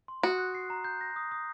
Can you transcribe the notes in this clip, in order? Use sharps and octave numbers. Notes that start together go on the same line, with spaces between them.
C6
F#4 D#6
F#6
C7
A#5
G6
A#6
D#6
D#6